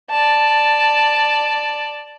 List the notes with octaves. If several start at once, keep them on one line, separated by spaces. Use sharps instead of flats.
D5 A5